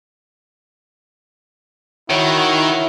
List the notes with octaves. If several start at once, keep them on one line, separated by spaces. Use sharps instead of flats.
D#3 E4 F#4 A#4 C#5 F#5